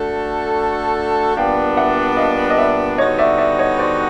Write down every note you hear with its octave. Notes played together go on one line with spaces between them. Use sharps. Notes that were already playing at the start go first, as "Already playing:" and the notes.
Already playing: A3 D4 F#4 A4
A#2 G3 B3 D4 F5 G5
E5 F#5
D#5 F5
D#5
D5 E5
D3 G3 B3 D#4 F#4 C#5 D#5
D5 E5
D5 E5
C#5 D#5
C5 D5